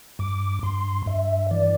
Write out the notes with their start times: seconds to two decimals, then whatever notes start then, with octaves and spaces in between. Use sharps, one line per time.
0.19 G2 D6
0.63 G2 C6
1.06 G2 E5
1.51 E3 D5